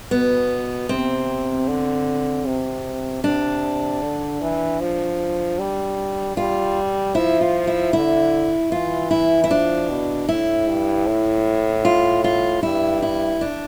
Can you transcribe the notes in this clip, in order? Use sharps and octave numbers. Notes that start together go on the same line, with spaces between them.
B2 B3
C3 C4
D3
C3
C3 D4
D3
E3
F3
G3
G3 F4
F3 E4
F4
E4
D3 E4
E3 F4
E4
E4
F3 D4
B2
A2 E4
G2
A2
F4
F4
G2 E4
E4
D4